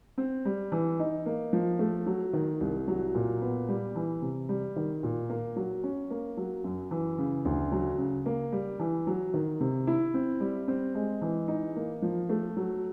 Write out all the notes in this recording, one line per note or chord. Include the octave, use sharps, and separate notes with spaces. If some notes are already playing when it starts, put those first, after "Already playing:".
C4
G3
E3
D#4
A#3
F3
A3
F#3
D#3
C2
F#3
A#2
B3
G3
E3
C3
G3
D#3
A#2
A#3
F#3
C#4
A#3
F#3
F#2
E3
C#3
D2
F#3
C#3
A#3
G3
E3
F#3
D#3
C3
E4
C4
G3
C4
G#3
E3
D#4
A#3
F3
A3
F#3